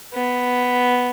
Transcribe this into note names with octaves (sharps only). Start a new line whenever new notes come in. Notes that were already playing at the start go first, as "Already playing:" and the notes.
B3